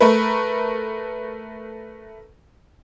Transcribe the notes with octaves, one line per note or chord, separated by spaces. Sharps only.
A3 A#4 B4